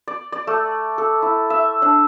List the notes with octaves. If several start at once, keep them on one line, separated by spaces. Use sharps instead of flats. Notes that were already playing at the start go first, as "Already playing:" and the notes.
D5
D5
A3
A4
E4
E5
D4